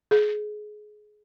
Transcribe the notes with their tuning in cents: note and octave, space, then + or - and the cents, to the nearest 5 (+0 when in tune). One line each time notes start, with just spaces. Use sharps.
G#4 +20